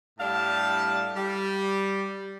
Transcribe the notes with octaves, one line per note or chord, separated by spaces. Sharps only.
A2 G3 D4 F5 A5
G3